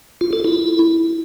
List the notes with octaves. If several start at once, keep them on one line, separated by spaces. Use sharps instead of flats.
F4
A4
E4